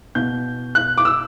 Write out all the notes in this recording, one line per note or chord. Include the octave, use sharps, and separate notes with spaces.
B2 G6
F#6
D6
E6